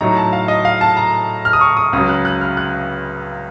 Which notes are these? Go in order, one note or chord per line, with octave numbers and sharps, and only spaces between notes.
A2 F#3 A3 D#4 A#5
A5
F5
D#5
F5
A5
A#5
F6
D#6
C#6
D#6
C#2 C#3 F#3 D#6
F#6
F#6
F6
F#6